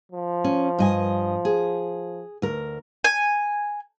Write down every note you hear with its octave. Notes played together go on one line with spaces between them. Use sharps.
F3
C#4
G2 D#5 G#5
G#4
D2 A#4
G#5